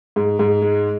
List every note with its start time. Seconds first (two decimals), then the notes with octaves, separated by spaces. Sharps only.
0.16 G#2
0.39 G#2
0.62 G#3